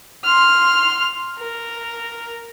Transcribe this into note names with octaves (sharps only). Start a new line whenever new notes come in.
C6 F6
A#4